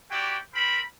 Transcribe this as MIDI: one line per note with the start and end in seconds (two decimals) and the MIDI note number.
0.11 0.37 64
0.11 0.37 66
0.11 0.37 67
0.11 0.37 74
0.11 0.37 79
0.54 0.81 60
0.54 0.81 70
0.54 0.81 83